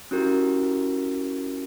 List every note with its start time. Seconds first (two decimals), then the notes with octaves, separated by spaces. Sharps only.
0.11 C#4 E4 F#4 G4 A#4